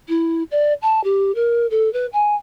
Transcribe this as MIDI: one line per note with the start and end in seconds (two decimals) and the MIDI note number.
0.08 0.43 64
0.51 0.73 74
0.82 1.02 81
1.04 1.34 67
1.35 1.66 70
1.70 1.91 69
1.93 2.06 71
2.13 2.35 80